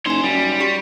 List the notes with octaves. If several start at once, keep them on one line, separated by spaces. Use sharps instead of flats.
F#1 D#4 C#5 G#5 C6
F#2 G3
G4 C#6